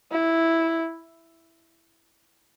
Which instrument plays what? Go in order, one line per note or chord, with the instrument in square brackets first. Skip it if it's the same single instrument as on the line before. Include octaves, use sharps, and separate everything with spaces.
[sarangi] E4